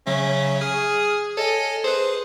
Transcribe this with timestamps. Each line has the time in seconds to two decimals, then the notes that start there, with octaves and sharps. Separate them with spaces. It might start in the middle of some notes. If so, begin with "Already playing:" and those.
0.07 C#3 F#3 C#4 E5
0.61 G#4 D#6 F6
1.37 A4 C#5 D#5 G#5
1.84 G#4 B4 C5